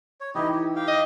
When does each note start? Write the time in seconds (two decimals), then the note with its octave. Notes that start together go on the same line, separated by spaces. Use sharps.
0.20 C#5
0.35 E3 D#4 E4 G4 D#5
0.52 G4
0.76 G4 F5 G5
0.88 D#5